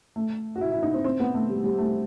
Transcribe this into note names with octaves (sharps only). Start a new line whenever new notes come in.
A3
F#4
E4
E4
D#4
C4
C4
B3
A3
G3
G3
A3